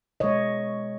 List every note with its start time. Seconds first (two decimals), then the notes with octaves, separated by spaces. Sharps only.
0.20 B2 G#3 C#5 D#5